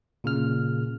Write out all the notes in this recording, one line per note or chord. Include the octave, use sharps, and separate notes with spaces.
A#2 C#3 F6